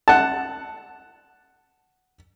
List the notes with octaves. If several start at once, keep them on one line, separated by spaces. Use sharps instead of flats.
F#5 A5